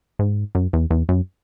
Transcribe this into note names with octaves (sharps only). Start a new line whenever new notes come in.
G#2
F#2
E2
E2
F#2